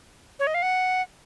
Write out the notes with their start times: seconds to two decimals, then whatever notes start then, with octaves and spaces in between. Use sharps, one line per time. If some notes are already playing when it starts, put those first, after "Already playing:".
0.39 C#5
0.47 D#5
0.54 F5
0.63 F#5